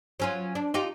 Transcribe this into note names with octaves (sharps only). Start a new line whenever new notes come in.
F#3 C#4 F4
D4
D#4 F4 G4